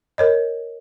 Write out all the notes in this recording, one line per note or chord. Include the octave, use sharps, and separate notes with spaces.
A#4 C#5 D#5